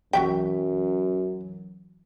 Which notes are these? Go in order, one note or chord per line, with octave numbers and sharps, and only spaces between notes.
B1 F#2 E3 F#3 F#4 E5 G5